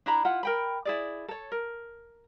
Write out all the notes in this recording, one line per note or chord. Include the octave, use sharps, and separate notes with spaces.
D4 E4 A#5 B5
E4 F4 F#5
A#4 G5 B5
E4 G#4 D5
A4 C#5
A#4